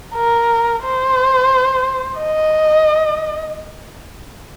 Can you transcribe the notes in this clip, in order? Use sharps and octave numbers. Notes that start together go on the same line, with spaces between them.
A#4
C5
D#5